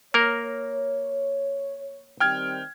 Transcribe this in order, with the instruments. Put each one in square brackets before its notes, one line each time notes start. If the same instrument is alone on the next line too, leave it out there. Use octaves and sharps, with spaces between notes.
[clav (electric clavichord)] A#3 A#4 [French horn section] C#5
[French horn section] D#3 G3 C4 [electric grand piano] G5 F6 G#6